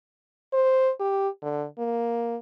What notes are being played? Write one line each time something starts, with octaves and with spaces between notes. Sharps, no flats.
C5
G4
D3
A#3